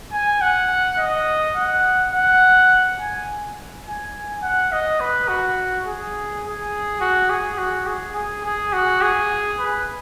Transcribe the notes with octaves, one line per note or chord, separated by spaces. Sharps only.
G#5
F#5
D#5
F#5
F#5
G#5
G#5
F#5
D#5
B4
F#4
G#4
G#4
F#4
G#4
F#4
G#4
G#4
G#4
F#4
G#4
B4